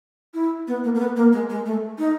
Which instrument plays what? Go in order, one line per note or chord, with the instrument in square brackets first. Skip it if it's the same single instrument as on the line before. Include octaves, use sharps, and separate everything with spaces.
[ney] E4
B3
A#3
A#3
B3
A#3
G#3
G#3
A3
D#4